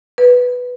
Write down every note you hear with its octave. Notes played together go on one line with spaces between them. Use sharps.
B4